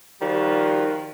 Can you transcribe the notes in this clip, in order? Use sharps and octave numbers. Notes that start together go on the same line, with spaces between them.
D#3 F3 G3 F4 F#4